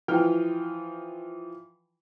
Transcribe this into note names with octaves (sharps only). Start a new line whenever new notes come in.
E3 F3 G5 F6